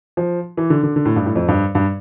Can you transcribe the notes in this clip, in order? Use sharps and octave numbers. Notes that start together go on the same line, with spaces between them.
F3
E3
D3
D3
D3
A2
G2
A2
F2
G2
G2